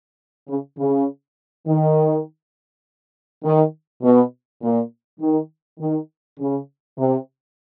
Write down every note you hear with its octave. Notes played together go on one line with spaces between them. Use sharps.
C#3
C#3
D#3
D#3
B2
A#2
D#3
D#3
C#3
C3